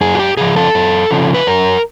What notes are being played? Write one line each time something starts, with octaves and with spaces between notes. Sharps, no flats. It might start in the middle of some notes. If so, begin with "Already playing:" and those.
F#2 G#4
F#4
G4
C#3 F3 G#4
A4
F#2
C#3 F3
B4
F#2 A#4